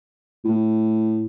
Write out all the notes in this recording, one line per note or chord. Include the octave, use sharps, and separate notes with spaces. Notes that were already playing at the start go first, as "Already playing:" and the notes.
A2